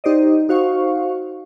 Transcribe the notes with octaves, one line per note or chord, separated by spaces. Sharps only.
D#4 G4 C5 D5 D#5
D#4 F#4 C5 F5 C#6